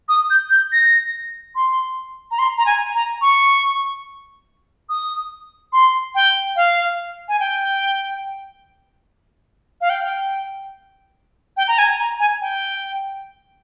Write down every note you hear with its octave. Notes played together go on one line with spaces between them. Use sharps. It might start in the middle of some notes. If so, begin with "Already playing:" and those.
D#6
G6
G6
A#6
C6
A#5
C6
A#5
G#5
A#5
C#6
D#6
C6
G5
F5
G#5
G5
F5
G5
G5
A#5
G#5
A#5
G#5
G5